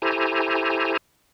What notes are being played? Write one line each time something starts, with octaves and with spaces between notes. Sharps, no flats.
E4 G4 A4 C5 G#5 A#5